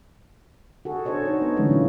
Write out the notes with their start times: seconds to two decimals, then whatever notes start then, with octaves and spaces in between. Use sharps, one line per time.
0.85 F#4 G#4 A4
1.05 D4 A4 C5 C#5 D#5
1.25 D#4 C#5
1.41 B3
1.57 D3 E3 F#3 G#3 A3 C#4
1.70 A#2 F4